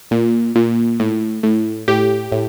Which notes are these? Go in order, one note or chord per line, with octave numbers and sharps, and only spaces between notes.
A#2
A#2
A2
A2
A2 G4
A2